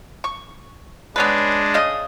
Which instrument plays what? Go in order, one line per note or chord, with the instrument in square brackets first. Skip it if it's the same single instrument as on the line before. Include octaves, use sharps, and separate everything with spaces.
[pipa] C#6
[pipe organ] G#3 D4 [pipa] B3 C#4 B4
[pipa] C#3 D#5